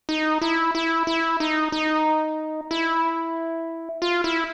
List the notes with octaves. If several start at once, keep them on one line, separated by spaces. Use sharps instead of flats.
D#4
E4
E4
E4
D#4
D#4
E4
F4
E4